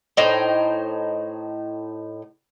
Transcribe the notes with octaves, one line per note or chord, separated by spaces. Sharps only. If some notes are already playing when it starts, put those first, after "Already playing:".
A2 D#4 C5 G5